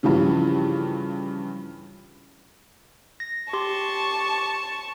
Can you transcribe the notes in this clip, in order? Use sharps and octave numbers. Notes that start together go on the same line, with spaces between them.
G2 C#3 E3 F3 C#4
A#6
G4 A5 C6 C#6